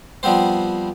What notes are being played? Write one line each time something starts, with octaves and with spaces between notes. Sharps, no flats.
F3 G3 B3 C4 C5